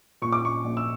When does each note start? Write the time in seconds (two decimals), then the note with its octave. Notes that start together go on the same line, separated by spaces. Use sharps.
0.22 A#2 C#6
0.32 D6
0.42 A#2 C#6
0.64 A#1
0.77 E6